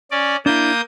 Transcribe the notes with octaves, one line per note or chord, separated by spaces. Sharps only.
C#4 D5
A#3 D4 E4 D#6 G6